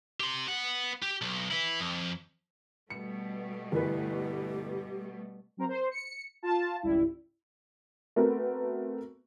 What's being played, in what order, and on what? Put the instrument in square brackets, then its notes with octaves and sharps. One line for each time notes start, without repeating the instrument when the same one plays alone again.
[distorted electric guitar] G4 C6
B3 F#5
G4
B1
E4 B4
F2
[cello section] B2 G3 A3 [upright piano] C#7
[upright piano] G1 E3 B4 [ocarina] G4
[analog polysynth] F#3 C4 A#4 C5
C5
C#7
F4 A5
G#1 C#2 G3 E4
[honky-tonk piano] A3 B3 C4 F#4 A#4 B4